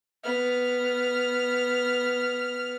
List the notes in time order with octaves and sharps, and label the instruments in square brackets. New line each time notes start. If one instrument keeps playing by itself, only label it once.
[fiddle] B3 F6